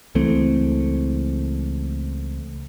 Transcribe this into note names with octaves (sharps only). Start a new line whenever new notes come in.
C#2 E3 A3 C4